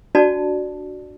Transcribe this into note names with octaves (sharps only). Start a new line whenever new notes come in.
D4 F#4 D5 A5